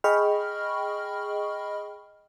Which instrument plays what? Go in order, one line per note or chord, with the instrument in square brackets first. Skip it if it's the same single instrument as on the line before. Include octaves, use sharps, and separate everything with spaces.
[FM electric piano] G#4 D#5 G5 B5 C#6 F6